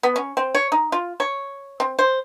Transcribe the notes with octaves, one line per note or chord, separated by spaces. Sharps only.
B3
C#4
C4
C#5
D#4
F4
C#5
C4
C5